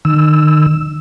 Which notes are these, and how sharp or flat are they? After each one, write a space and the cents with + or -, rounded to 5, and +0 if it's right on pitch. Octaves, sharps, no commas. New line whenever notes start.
D#3 -30 E6 +0